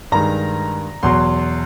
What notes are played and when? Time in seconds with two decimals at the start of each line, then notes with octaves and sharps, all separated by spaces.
0.12 G2 D#3 G#3 A#5
1.03 E2 B2 F#3 C6